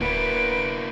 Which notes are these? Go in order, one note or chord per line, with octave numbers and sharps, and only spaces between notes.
D1 A#3 B3 E4 F#4 B4 D7